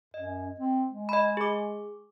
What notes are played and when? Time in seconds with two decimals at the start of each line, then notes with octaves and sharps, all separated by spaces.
0.14 F#2 D#5
0.60 C4
0.90 G#3
1.09 D#5 B5
1.37 G#4 D6